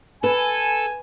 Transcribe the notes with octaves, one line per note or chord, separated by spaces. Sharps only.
A4 B4 G#5